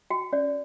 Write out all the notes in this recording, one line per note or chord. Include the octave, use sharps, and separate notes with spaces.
F#4 G5
C#4 D5